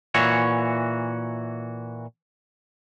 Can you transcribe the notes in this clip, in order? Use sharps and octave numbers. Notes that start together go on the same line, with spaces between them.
A#2 E3 F#4 C#5